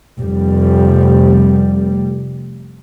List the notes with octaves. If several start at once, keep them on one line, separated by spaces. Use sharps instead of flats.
F1 G3